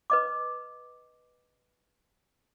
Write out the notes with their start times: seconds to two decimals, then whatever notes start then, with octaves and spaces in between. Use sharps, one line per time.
0.10 B4 D#5 D6